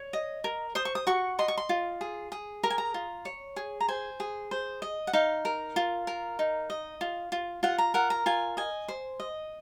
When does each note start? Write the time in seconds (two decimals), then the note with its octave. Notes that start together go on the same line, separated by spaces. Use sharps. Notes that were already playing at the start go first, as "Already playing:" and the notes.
Already playing: C#5
0.13 D#5
0.44 A#4
0.75 C5 D#6
0.85 C#6
0.95 D#6
1.07 F#4 C#6
1.39 D#5 C6
1.48 C#6
1.57 C6
1.69 F4
2.01 G#4
2.32 G#4
2.63 A#4 A#5
2.70 G#5
2.78 A#5
2.94 F4
3.25 C#5
3.56 G#4
3.80 A#5
3.88 C5 G#5
4.20 G#4
4.51 C5
4.82 D#5
5.07 F#5
5.13 D#4 F5
5.45 A#4
5.76 F4
6.07 A#4
6.39 D#4
6.70 D#5
7.01 F4
7.32 F4
7.63 F4 F#5
7.78 A#5
7.94 A#4 F#5
8.10 A#5
8.26 F4 G#5
8.57 D#5 G#5
8.88 C5
9.20 D#5